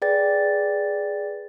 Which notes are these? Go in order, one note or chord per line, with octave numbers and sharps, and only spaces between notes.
G#4 B4 D5 G5 A6